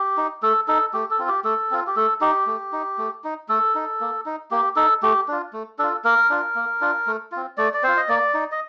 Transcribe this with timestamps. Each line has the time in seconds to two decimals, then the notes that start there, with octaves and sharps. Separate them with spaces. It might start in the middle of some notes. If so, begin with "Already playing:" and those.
Already playing: G4
0.17 D#4
0.43 A3 A4
0.68 D#4 A4
0.93 A3 G4
1.11 A4
1.19 C4 F4
1.28 G4
1.44 A3 A4
1.71 C4 F4
1.87 G4
1.96 A3 A4
2.21 D#4 G4
2.47 A3
2.72 D#4
2.98 A3
3.24 D#4
3.49 A3 A4
3.75 D#4
4.01 A#3
4.26 D#4
4.51 A#3 G4
4.76 D#4 A4
5.03 A3 G4
5.28 D4 F4
5.53 A3
5.79 D4 F4 A4
6.04 A#3 A#4
6.30 D4 F4
6.55 A#3
6.81 D4 F4
7.07 A3
7.32 C4 F4
7.57 A3 D5
7.74 D5
7.83 C4 F4 C5
7.97 D#5
8.09 A#3 D5
8.34 D#4
8.52 D#5